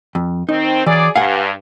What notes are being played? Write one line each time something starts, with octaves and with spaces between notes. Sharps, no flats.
F2
D#3 C4 D#4
E3 F#3 G#4 D5
G2 F5 F#5 G#5